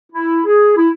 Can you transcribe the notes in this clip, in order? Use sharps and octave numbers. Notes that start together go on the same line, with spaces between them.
E4
G#4
E4